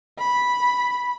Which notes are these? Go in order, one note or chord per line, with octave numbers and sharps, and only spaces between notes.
B5